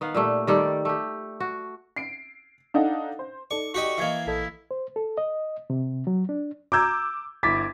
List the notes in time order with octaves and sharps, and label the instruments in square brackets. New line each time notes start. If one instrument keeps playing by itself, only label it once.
[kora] D#3 B3 F5
A#2 G3 A3
D#3 G3 A4 D5
A3 G4
F#4
[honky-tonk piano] C7 D7
D4 D#4 A4 F5 F#5
C5
[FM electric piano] D#4 A4 D5 [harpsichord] C#6
[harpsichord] F#4 G4 D#5 [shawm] C#6
[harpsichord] E3 A#3 [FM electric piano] D#5 G#6 C7
[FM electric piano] A#1 A4 D#5 [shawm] E4
[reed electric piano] C5
A4
D#5
C3
F#3
D4
[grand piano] A#5 G6 G#6 [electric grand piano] D6 E6
[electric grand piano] G1 E4 G#6 [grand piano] D6 A6 B6